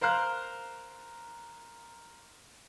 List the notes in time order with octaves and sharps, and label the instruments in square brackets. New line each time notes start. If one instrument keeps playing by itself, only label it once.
[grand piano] A#4 C5 F5 A#5 F#6